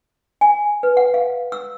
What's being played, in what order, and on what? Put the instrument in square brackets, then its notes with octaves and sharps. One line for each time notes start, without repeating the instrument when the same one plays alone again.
[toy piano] G#5
B4
F#5
F5
E6